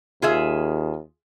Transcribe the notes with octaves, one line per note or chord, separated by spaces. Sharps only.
D#2 F4 G#4 E5